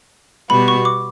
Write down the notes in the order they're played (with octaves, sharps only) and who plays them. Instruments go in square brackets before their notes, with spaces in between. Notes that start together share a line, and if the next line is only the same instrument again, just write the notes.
[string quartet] B2 G3 B3 F#4 [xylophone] B5
[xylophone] C#6
D6